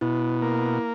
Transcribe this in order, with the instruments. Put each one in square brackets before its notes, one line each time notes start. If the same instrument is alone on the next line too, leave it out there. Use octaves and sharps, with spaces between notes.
[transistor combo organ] B2 [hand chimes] E4
[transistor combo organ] A#3